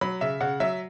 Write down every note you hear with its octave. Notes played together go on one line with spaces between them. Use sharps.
F#3 B5
C#3 E5
C#3 F#5
F#3 E5